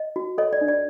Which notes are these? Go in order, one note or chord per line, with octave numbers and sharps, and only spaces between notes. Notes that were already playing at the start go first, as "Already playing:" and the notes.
Already playing: D#5
F#4
A4 C#5 D#5
D5
D4
D5